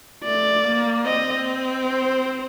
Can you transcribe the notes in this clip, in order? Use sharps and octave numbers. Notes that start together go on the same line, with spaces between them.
A3 D5
A#3
C4 D#5
C5